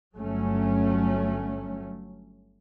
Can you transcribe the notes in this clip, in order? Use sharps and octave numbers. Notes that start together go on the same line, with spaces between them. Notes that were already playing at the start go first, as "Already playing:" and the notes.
G1 F#3 A3 C#4